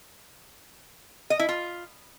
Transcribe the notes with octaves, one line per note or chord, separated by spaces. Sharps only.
D#5
E4
F4